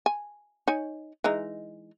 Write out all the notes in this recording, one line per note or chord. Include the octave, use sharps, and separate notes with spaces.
G#5
D#4 C#5 G#5
E3 G#3 D#4